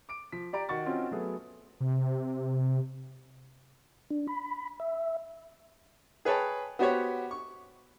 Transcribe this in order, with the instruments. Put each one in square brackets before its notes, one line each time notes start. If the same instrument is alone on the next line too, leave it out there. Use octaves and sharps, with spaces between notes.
[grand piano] D6 D7
F3 B6
G4 D5 A#5 D7
D#3 F#4 C#6 A6
C4 C#4 D#4 F4 F#4
F#3 A3 B3 G#4
[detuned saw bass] C3
[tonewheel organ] D4
B5
E5
[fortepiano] G#4 B4 C#5 G5 A5
B3 F#4 G4 C5 C#5
C#6